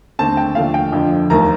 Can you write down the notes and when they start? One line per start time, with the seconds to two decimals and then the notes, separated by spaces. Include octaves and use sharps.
0.19 D#2 D3 A3 C4 A5
0.37 G5
0.55 D#2 D3 F3 A3 D4 F5
0.74 G5
0.92 F2 D3 F3
1.30 F1 D#2 D#3 A#3 A#5